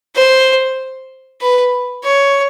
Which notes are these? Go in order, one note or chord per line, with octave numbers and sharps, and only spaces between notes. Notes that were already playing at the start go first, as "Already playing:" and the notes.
C5
B4
C#5